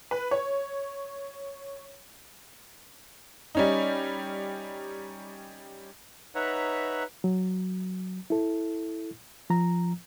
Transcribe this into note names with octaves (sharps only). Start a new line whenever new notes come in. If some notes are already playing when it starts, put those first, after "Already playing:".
B4
C#5
G3 C#4 D#4
D#4 B4 C#5 E5 F#5 A#5
F#3
E4 A4
F3 A#5